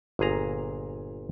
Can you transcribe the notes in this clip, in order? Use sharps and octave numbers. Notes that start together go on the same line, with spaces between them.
G1 A#2 G#4 A#5